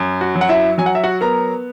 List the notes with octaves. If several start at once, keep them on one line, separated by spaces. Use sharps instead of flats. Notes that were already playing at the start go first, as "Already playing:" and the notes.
Already playing: F#2
F#4
F#3
F#5
E4 E5
F#3 G#5
F#5
E5
F#4 F#5
B3 A#4 A#5